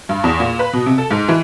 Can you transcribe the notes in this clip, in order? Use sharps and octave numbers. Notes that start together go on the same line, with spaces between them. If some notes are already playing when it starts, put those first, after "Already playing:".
G2
E2
A#2
B4
B2
C3
A4
G#2
E3